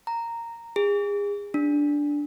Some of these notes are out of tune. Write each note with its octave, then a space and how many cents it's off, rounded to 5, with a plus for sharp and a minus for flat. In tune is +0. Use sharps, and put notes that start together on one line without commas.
A#5 -10
G#4 -35
D4 -5